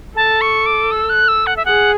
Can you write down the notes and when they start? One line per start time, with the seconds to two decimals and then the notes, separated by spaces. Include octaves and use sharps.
0.16 A4 A5
0.41 C#6
0.66 D6
0.92 E6
1.10 F#6
1.28 E6
1.47 F#5
1.57 E5
1.65 G#4 F#5